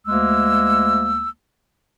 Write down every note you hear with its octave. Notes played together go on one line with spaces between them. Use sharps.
D2 G#3 A#3 E6